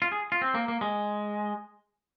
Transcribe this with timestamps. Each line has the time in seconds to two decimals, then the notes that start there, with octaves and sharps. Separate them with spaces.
0.02 F4
0.12 G#4
0.32 F4
0.42 C4
0.55 A#3
0.68 A#3
0.81 G#3